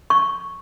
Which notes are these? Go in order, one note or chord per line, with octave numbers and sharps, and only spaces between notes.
C#6